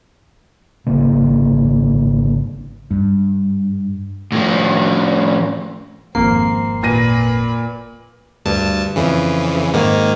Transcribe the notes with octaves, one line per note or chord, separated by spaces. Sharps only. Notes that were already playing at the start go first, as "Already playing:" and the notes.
G#1 C#3 A#3
G2
A2 F3
G#1 F2 A#3 C4 C7
A#2 B4 B5 A#6 D#7
D2 G2 A5
F2 C#3 E3
G#2 D#3 A#3